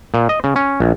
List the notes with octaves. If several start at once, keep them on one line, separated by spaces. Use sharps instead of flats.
A#2
D#5
C#3
C#4
A#1